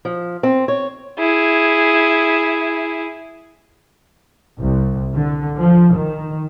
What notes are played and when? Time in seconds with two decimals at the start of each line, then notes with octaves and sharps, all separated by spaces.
0.05 F3
0.43 C4
0.68 C#5
1.19 E4 G#4
4.57 C2
5.15 D3
5.58 F3
5.94 D#3